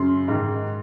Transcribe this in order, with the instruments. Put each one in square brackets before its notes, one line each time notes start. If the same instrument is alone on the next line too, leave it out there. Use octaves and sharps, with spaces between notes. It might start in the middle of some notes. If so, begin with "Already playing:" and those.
Already playing: [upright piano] F#2 C#3 C6
G#2 D#3